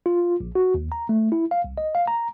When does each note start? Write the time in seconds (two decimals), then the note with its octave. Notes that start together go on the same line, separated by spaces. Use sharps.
0.06 F4
0.40 A#1
0.55 F#4
0.74 D#2
0.92 A#5
1.09 A3
1.32 E4
1.51 F5
1.64 C2
1.78 D#5
1.95 F5
2.08 A#5